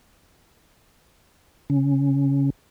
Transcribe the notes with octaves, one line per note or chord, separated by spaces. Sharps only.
C#3 C#4